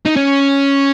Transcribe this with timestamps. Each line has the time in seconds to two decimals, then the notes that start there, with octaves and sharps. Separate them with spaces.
0.06 D#4
0.17 C#4